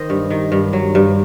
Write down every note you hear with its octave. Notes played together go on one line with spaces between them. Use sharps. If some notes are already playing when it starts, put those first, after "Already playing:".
Already playing: D#3 C5 D#5
G2
D#3
G2
F#3
G2